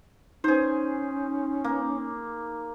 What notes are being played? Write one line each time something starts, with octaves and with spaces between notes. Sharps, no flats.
C#4 D#4 G#4 C5
A#3